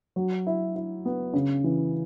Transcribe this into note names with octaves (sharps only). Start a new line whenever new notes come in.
F#3
E4
E4
B3
C#3
E3